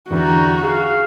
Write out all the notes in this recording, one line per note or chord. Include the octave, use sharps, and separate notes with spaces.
E2 D3 G3 F#4 E5 A#5
G#4 F5